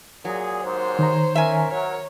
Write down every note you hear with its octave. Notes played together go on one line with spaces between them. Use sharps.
A#2 F#3 G#4
D#2 G#2 C5 C#5
D#3 A#5
C#4 A#4 E5 G#5
F#3 A#4 C#5